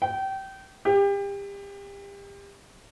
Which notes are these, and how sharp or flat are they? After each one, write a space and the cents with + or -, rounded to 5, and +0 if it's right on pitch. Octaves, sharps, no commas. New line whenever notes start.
G5 -25
G4 +30